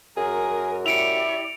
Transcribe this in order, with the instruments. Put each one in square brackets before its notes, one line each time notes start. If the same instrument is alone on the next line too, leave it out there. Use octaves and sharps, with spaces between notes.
[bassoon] F#2 [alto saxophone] G#4 [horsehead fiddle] A#4
[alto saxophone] E4 [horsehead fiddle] G4 D5 [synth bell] C#7 D7 F7